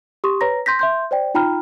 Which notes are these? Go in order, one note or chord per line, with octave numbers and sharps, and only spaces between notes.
G4 C6 C#6 D#6
B4 C#5 A#5 A#6
C6 G6 A#6 B6
E5 C6 G6
C5 D5 G5
D#4 F4 G5 A#5 B5 F6